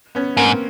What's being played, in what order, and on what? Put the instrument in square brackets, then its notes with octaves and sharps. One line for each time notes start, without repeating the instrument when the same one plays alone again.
[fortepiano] B3 C#4
[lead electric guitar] G#2 [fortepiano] A#3 C4